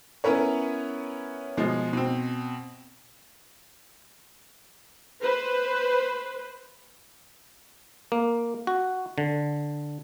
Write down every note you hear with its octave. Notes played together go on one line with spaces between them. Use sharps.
B3 C#4 E4 A#4 B4 C#5
B2 F3 G#3
B2 C4
B4 C5
A#3
F#4
D3